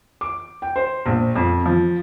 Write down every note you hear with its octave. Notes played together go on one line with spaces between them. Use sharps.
D6
G5
C5
A#1
F2
F3